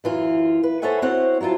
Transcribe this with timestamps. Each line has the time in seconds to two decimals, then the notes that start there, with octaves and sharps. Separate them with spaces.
0.04 F#2 E3 F4
0.63 B4
0.82 A4 C5 C#5 E5 F#5 G#5
1.02 C4 E4 F#4 C5 C#5 F#5
1.41 F#3 G3 E4 F4 A5